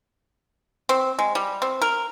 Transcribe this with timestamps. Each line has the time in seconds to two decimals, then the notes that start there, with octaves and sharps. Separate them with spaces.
0.89 C4
1.19 G#3
1.35 G3
1.62 C4
1.82 A#4